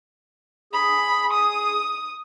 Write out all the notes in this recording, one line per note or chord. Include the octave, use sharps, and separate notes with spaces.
G#4 B5
D#6